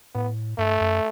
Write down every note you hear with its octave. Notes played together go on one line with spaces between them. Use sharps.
A2 B3
G2 A3
F#2